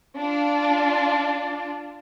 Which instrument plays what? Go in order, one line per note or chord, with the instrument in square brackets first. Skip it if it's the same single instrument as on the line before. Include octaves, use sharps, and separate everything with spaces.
[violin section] D4 F4